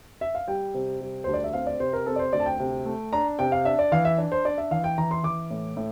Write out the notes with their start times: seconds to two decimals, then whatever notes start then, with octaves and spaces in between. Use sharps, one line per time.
0.21 E5
0.35 F5
0.48 G3 G5
0.74 C3
1.01 G3
1.24 D2 C5
1.34 D5
1.44 E5
1.53 C4 F5
1.67 D5
1.80 C3 C5
1.93 A#4
2.06 C4 A4
2.16 D5
2.19 C5
2.33 D2 D5
2.40 A5
2.46 G5
2.59 C3
2.86 A3
3.13 D4 A#5
3.39 C3 G5
3.52 F5
3.65 D4 E5
3.79 D5
3.92 E3 F5
4.05 E5
4.18 D4
4.32 C5
4.45 D4 D5
4.58 E5
4.71 E3 F5
4.84 G5
4.98 E3 A#5
5.11 C6
5.23 E3 D6
5.50 A2
5.77 A2